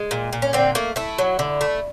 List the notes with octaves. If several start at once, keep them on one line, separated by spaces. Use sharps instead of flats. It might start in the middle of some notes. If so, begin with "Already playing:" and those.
Already playing: G#3
A#2
A#2
C#4
D3 C4
A3 A#3
A3 E4
F#3
D3
A3